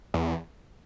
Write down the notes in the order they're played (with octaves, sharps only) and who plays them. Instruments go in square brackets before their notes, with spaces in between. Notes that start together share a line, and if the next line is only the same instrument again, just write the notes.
[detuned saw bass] E2